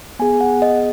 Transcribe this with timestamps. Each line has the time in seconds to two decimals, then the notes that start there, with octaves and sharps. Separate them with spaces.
0.19 B3 G#4 G#5
0.41 F#5
0.62 D#5